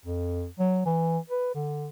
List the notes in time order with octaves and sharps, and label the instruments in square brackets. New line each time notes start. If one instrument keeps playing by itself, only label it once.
[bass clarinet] F2
F#3
E3
B4
D3